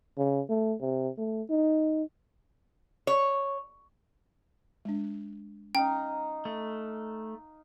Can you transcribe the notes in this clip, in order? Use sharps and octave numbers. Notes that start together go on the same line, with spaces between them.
C#3
A3
C3
A3
D#4
C#5
G#3 D4
C#4 D#4 F5 G5 A#5
A3